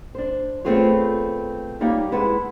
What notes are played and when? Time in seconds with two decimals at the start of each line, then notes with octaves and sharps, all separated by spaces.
0.15 D4 C5
0.65 A3 B3 C4 F4 G#4 C#5
1.81 G3 A#3 D#4 G4 C#5
2.12 G#3 E4 B4 F#5 A5